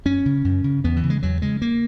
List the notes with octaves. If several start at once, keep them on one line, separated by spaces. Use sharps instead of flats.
F#2 C#4
C#3
F#2
C#3
E2 B3
E3
C#3
G#3
E2 F#3
C#3 G#3
A#3